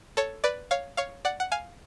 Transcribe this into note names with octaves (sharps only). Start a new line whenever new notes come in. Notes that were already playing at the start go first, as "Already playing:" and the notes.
A4 C#5
B4 D5
C#5 F5
C#5 F5
D5 F#5
F#5
F5 G#5